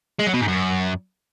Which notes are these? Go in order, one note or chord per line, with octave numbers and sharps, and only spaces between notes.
G#3
F#3
B2
G#2
F#2